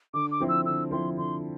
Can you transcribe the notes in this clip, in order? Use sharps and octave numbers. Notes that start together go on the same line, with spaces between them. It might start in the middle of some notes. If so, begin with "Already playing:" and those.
D3 D6
D6
F3 C4 E4
E6
D3 E6
F3 C4 E4 C6
D3 C6